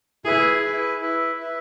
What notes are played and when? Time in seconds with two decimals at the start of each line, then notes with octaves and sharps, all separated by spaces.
0.25 E4 G#4 B4 E5
0.63 E4 B4 E5
1.01 E4 B4 E5
1.39 E4 B4 E5